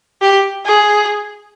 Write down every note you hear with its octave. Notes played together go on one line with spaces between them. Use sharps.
G4
G#4